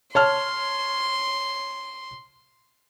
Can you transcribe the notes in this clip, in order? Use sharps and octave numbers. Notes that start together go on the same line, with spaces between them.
C#5 A5 C6 F6